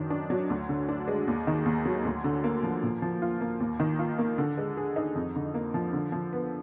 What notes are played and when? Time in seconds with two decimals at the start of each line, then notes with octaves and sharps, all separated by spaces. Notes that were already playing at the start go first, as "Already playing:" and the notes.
Already playing: F#2 D#3 D4
0.10 D4
0.30 F#3
0.50 D2
0.69 D3
0.89 D4
1.08 G#3
1.27 D#2
1.47 D#3
1.66 D#2
1.86 F#3
2.05 D2
2.24 D3
2.44 A#3
2.63 F3
2.83 A#2
3.02 F3
3.22 F4
3.41 A#3
3.60 D#2
3.80 D#3
3.99 F4
4.18 A#3
4.38 D3
4.58 G#3
4.77 G#4
4.96 D#4
5.15 F2
5.36 D3
5.54 A#3
5.74 F3
5.93 D3
6.12 F3
6.33 B3